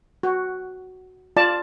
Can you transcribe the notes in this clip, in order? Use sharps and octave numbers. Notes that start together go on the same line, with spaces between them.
F#4
F4 D5 A5